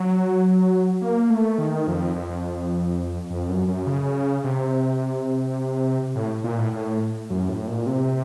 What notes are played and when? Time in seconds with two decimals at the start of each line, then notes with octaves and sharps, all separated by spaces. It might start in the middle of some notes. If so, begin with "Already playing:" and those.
Already playing: F#3
1.01 A#3
1.30 A3
1.58 D#3
1.87 F2
2.16 F2
3.30 F2
3.49 F#2
3.68 F#2
3.87 C#3
4.44 C3
6.15 A2
6.44 A#2
6.58 A2
6.73 A2
7.30 F#2
7.49 A2
7.68 A#2
7.87 C3